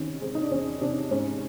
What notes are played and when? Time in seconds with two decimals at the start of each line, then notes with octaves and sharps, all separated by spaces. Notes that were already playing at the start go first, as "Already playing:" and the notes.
Already playing: E2 C3 D#3 C#4 D#4
0.21 G#3 C4
0.35 D#4
0.43 D4
0.51 E2 C#4
0.81 C3 C4 D4
1.11 G#2 C#4